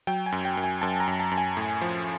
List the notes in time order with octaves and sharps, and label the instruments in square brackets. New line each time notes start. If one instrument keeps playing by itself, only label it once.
[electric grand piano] F#3 G5
G#5
F#2
G5
F#2
G#5
F#2 A5
A#5
F#2
A5
F#2
G#5
A2
F3